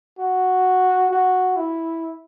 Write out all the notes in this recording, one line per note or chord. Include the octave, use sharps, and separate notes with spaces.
F#4
F#4
E4